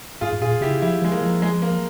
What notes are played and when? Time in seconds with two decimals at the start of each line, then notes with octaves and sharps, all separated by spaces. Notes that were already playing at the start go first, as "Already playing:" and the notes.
0.21 G#2 F4 G#4
0.33 G#2
0.41 A#2 F4 G#4
0.61 C#3 E4 G4
0.82 F3 E4 G4
1.02 F3 G#3
1.12 A#3
1.22 F3
1.42 G#3
1.62 A#3